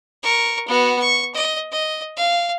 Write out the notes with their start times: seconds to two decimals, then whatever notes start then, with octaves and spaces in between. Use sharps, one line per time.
0.23 A#4 C#6
0.68 B3 F#4
1.00 C#6
1.34 D#5
1.72 D#5
2.17 F5